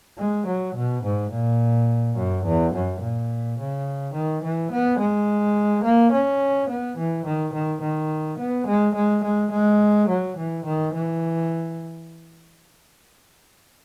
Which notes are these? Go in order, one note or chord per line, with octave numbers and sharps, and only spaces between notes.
G#3
F#3
B2
G#2
A#2
F#2
E2
F#2
A#2
C#3
D#3
E3
B3
G#3
A#3
C#4
B3
E3
D#3
D#3
D#3
B3
G#3
G#3
G#3
G#3
F#3
E3
D#3
E3